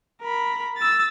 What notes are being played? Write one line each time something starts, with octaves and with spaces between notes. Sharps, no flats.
A#4 B5
E6 A6